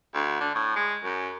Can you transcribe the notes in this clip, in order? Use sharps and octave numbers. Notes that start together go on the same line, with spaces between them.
D2
D3
A2
G#3
F#2